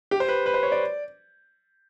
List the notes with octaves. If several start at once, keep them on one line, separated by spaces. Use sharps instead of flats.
G4
C5
B4
B4
C5
C#5
D5